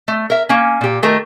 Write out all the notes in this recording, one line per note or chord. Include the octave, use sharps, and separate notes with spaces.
A3
A#4 E5
A#3 C#4
A#2 G4
D#3 A3 A#4